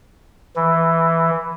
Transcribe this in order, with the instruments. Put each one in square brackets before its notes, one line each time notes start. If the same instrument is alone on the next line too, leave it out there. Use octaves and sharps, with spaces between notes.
[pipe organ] E3